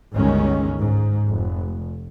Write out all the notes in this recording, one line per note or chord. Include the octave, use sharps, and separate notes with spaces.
G1 C#2 D#3 G#3 C#4
G#2
F1